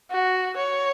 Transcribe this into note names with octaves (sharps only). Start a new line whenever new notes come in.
F#4
C#5